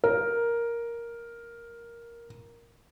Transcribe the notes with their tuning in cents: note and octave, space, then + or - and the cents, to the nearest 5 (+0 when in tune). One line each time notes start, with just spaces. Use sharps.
A#4 +5